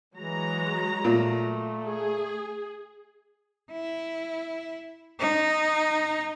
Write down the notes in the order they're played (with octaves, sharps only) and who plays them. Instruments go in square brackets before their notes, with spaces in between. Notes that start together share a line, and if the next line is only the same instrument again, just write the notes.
[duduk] E3 [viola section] F#3 G#3 A#5
[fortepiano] A#2 [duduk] A3
[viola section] G#4
[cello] E4
D#4